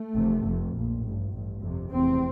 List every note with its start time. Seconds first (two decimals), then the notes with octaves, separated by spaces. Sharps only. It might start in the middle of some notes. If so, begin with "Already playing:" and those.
Already playing: A3
0.14 F1 E2 C3
0.44 F1 F2 C3
0.73 A#1 A#2
1.02 A1 G2
1.32 A1 G2
1.61 G1 F2 C3
1.91 F1 E2 C3 C4